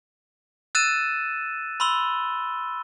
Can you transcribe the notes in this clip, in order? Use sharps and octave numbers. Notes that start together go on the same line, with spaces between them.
E6 F#6 A6 D#7 E7
B5 C6 E6 G7